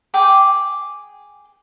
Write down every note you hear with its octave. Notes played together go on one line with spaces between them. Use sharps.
G#4 G5 D6